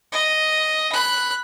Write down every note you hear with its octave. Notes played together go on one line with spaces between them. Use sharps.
D#5
B5 F#6